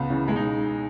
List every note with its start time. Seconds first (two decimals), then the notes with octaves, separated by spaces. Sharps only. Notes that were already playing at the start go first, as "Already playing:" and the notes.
Already playing: C#2 B3
0.10 C#3 E3
0.28 B1 G#3
0.36 D#4